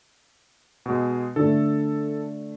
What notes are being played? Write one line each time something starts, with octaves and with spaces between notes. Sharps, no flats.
B2 G#3
D3 A3 A4